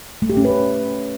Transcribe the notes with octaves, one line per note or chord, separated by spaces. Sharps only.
A3
G4
C#4
B4